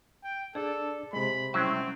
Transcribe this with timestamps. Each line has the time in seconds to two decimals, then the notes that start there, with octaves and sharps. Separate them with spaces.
0.23 G5
0.55 D4 G#4 A4 D5
1.13 C3 G#3 B5
1.54 F#3 G3 C4 C#4 E4